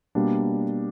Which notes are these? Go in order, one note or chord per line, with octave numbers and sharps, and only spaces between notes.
B2 G3 A#3 D4